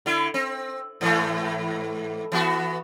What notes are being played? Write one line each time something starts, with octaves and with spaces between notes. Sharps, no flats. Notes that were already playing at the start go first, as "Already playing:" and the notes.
D3 E4
C4
G#2 E3 A3
E3 B3 F#4